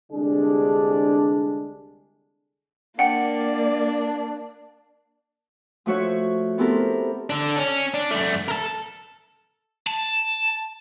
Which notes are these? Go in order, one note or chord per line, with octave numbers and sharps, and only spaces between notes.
C2 D3 G3 G#3 D4 G#4
A#3 D4 D5 F#5 G5
F3 A3 F#4 C#5 E5
B3 C4 E4 G4 A4 A#4
D4 A4
C#4
D4
F#2 A3
A4 A#4
A5